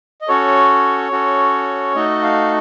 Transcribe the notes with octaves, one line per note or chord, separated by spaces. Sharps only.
D#5
C#4 F#4 A4 C#5
C#4 F#4 A4
A3 D#4 F#4 A4 D#5
F5